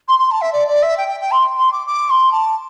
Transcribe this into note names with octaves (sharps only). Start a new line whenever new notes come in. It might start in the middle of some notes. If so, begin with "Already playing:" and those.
C6
C6
A5
E5
D5
D5
E5
G5
G5
G5
C6
C6
D6
D6
C6
A5